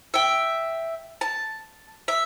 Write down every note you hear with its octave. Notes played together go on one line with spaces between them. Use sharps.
E5 G5
A5
E5